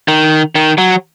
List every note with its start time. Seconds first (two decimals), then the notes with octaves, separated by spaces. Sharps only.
0.08 D#3
0.55 D#3
0.78 F#3